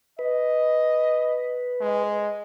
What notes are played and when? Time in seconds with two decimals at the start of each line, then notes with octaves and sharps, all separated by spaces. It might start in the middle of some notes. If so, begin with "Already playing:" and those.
0.19 B4 D#5
1.81 G#3